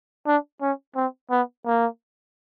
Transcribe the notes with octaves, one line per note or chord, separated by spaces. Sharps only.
D4
C#4
C4
B3
A#3